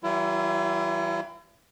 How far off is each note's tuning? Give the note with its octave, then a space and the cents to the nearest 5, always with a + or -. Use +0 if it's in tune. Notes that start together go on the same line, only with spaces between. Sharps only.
E3 -10 G3 -40 E4 +40